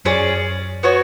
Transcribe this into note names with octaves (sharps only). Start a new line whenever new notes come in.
F#2 C#4 G#4 D5
B3 F#4 C#5